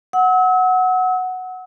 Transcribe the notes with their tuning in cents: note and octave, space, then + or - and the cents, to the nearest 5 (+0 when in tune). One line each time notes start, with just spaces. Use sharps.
F#5 +0 E6 -40